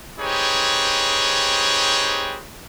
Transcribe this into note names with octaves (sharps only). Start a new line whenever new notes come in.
C4 D#4 G4 G#4 B4 C#5